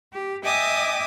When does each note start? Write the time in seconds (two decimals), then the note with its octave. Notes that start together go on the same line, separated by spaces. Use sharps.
0.12 G4
0.43 D#5 E5 G5 G#5 D6 D#6